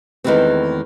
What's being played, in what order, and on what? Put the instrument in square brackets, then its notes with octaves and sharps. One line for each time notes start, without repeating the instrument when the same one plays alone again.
[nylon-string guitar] E2 D#3 E3 G#3 A3 C4